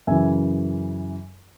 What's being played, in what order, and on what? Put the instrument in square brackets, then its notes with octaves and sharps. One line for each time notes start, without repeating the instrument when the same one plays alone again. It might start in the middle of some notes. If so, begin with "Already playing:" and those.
[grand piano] F#2 C#3 E3 E5 G#5